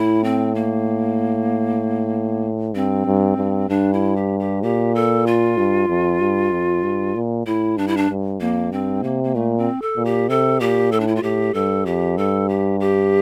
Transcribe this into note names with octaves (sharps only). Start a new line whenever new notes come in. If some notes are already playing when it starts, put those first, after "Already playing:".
Already playing: A2 E4
C4
A#3
G2 C4
G2
G2
G2 D4
E4
G4
G4
A#2 G4
A4
F4
G2
F2
G2
F2
G2
A#2
A2 E4
G2 D4
E4
D4
G2
F2 A#3
G2 C4
C3 A#3
A#3
A#2 A3
C4
A4
A#2
G4
C3 A4
A#2 G4
A2 A4
D4
E4
F4
A2 G4
G2 A4
F2 G4
G2 A4
G4
G4